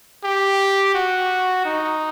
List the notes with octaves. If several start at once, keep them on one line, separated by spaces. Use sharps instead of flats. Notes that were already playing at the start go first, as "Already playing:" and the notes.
G4
F#4
D#4